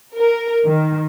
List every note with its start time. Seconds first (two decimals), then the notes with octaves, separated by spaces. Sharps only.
0.17 A#4
0.66 D#3